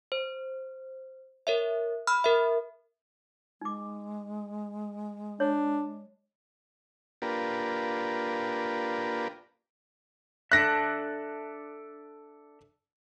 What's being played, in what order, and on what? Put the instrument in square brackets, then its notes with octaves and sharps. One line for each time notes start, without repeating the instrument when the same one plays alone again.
[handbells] C5
A#4 C#5 E5
B5 E6 F6
A#4 E5
[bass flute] G#3 [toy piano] D#4 D6
[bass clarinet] D4 [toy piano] C#5
[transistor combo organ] A#3 D4 F4 G4 A#4 B4
[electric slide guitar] D4 A4 E5 [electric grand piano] F#6 A#6